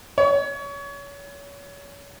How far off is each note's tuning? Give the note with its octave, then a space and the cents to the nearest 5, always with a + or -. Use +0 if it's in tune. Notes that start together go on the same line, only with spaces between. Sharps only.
C#5 +30